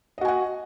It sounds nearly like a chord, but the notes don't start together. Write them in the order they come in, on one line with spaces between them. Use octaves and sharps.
D#5 F#4 G#5 F#5